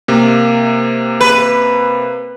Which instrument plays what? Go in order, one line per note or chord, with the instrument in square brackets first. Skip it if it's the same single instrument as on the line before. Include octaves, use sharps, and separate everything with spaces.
[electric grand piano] C3 A#3
[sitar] B4